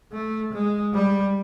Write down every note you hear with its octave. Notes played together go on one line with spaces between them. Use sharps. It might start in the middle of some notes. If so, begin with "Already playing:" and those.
A3
G#3
G3